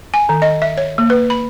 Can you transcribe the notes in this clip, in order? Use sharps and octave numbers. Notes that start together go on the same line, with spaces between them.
G#5
D#3
D#5
E5
C#5
A#3
B4
B5